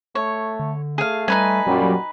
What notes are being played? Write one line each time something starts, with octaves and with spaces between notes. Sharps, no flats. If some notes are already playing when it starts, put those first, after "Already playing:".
A3 C#5
D3
A3 G#4 F5
G3 D#4 B4 G#5
F#2 A#2 F#3 G3 F#4